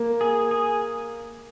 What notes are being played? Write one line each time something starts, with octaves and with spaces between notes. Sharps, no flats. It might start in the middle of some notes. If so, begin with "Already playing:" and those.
Already playing: A#3
G#4
G#4